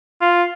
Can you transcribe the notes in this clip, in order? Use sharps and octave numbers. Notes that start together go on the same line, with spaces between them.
F4